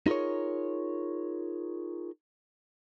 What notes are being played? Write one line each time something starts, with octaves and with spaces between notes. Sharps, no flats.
D#4 F4 G#4 A#4 C#5